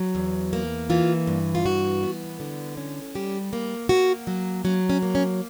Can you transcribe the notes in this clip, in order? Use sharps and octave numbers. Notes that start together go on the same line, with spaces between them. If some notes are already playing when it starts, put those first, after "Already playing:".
Already playing: F#3
E2
A#3
E3 F4
G2
F4
E3 F#4
B3
D3
C#4
G3 G4
A#3
A#3 F#4
F#3
F#3 C#4
C#4
A#3
C#4